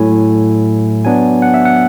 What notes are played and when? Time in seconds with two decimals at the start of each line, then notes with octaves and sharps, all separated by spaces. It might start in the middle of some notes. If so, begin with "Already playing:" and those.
Already playing: A2 F#3 A3 E4 G#5
1.05 F#3 B3 D4 G#5
1.42 F#5
1.54 E5
1.65 F#5